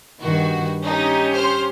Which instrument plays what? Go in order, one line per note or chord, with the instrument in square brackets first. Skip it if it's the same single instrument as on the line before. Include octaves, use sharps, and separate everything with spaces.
[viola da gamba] G2 D#3 [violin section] F#4
[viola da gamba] C#4 G4 [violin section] D#4
[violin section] C5 F6